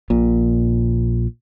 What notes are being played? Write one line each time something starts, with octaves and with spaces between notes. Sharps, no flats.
A#1 A#2